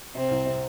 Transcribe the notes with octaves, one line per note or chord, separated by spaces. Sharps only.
C3 C4
C2
C3